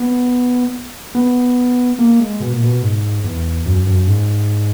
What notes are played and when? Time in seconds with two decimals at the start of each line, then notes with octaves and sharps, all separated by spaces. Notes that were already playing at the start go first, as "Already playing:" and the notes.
Already playing: B3
1.15 B3
1.99 A#3
2.20 G#3
2.40 B2
2.52 A#2
2.64 B2
2.82 G#2
3.24 E2
3.66 F#2
3.87 F#2
4.07 G#2